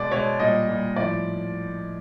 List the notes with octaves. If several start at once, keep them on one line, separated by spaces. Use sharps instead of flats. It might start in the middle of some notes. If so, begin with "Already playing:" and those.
Already playing: B2 G#3 D5
B2 G#3 C#5
A#2 G3 D#5
A#2 G3
A2 F3 D5